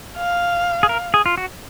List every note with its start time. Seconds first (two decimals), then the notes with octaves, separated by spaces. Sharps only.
0.17 F5
0.83 G#4
0.89 A#4
1.14 G#4
1.26 F4
1.38 F#4